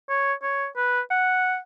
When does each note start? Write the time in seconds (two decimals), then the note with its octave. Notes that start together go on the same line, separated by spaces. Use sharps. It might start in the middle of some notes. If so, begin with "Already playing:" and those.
0.09 C#5
0.42 C#5
0.77 B4
1.11 F#5